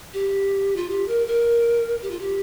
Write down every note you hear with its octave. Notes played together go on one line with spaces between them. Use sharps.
G4
F4
G4
A#4
A#4
G4
F4
G4